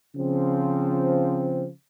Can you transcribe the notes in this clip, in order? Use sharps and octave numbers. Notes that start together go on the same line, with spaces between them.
C#3 F3 C4